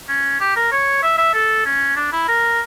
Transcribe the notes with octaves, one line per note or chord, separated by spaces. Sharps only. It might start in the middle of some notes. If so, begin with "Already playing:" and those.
C#4
G4
A#4
C#5
E5
E5
A4
C#4
D4
E4
A#4